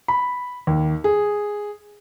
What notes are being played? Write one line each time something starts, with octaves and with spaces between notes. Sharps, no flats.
B5
D#2
G#4